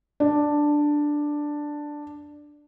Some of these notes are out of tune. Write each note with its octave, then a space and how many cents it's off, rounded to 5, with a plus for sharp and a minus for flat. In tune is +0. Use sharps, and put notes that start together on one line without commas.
D4 +5